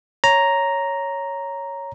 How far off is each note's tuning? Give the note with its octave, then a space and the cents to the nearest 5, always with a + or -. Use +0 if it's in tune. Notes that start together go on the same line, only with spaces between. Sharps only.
C#5 +0 A#5 +0